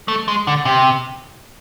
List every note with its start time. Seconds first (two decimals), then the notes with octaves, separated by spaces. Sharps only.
0.08 A3
0.28 G#3
0.47 D3
0.65 C3